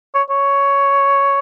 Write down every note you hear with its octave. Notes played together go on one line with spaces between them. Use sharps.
C#5
C#5